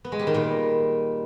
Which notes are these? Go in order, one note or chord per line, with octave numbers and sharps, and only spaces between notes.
B3
G#3
G3
D#3
A#2